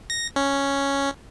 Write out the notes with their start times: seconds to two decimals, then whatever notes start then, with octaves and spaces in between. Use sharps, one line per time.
0.10 A#6
0.36 C#4